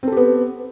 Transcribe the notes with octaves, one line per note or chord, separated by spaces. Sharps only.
B3 C4 G4 A4